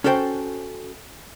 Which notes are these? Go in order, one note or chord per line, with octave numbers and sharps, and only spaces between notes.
C#4 F#4 A4 C5 G5